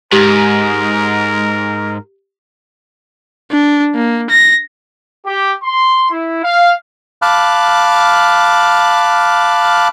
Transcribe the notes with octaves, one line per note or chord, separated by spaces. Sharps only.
G#2 G4 A#4
D4
A#3
A#6
G4
C6
E4
F5
F5 A5 B5 D6 F6 F#6